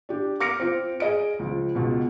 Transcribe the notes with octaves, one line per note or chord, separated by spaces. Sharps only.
D4 G4
D6 F6 A#6 C#7 D7
C4 F4
G#4 D#5 D7
C#2 F3
C#2 B2